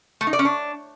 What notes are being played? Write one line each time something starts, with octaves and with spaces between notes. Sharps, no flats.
A3
D#4
D5
C#4
D4